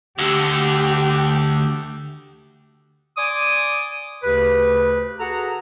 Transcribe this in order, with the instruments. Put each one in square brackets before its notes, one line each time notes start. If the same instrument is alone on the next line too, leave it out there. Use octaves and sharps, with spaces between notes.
[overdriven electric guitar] D2 D3 [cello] G4
[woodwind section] D5 G#5 C6 D6 D#6
D2 C#3 G4 B4
F#4 G#4 A4 F#5 A#5